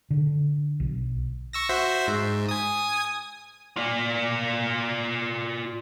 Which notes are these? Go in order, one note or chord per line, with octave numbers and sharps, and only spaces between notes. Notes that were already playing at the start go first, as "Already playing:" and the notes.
D3
B1
C#6 E6 A#6
F#4 C5 E5
G#2
G#5 D#6
F4 D5